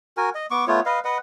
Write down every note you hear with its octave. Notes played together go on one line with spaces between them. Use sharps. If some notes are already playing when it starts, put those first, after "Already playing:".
F#4 A#4 G#5
D#5
B3 C#6 D6
A3 B3 F4 C#5
B4 D#5 F5
B4 D#5 F#5